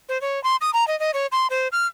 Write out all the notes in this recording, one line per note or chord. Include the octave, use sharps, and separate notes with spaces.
C5
C#5
C6
D#6
A#5
D#5
D#5
C#5
C6
C5
F6